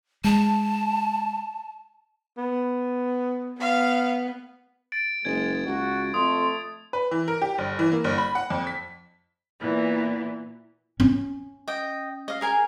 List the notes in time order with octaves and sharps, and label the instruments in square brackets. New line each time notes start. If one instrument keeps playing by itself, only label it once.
[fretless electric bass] G#3 [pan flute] A5
[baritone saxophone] B3
[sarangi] B3 [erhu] F5
[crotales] A6 D7
[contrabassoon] F#1 [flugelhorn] G#3 [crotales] G#6
[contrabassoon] C#2 [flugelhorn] F#4
[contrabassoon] F2 [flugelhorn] A3 [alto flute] C6 [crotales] D#6
[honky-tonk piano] B4
E3
A#4
G4
G1
E3
A#3
G1
B5
F#5
F2
B6
[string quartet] A#2 E3 B3
[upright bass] C#4
[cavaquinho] D#5 G5
D#5 F5
G#4 A#4 G#5